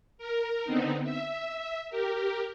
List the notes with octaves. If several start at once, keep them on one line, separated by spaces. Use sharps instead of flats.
A#4
D3 B3 C4 D#4
E5
G4 A#4